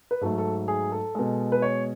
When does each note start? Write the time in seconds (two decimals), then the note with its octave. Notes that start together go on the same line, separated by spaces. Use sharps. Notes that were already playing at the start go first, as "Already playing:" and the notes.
0.11 B4
0.21 G#2 F#3 A3 A4
0.38 A4
0.68 G#4
0.92 A4
1.15 B2 G#3
1.52 B4
1.62 C#5